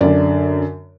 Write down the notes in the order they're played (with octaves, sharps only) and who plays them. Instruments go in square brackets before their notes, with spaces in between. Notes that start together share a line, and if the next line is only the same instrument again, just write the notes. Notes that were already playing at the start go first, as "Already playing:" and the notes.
[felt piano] F#2 D3 D5